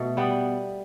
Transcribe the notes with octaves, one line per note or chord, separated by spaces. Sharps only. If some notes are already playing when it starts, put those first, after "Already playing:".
Already playing: B2 A3
G3 B3